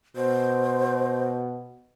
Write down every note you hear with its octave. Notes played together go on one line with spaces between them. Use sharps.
B2 C5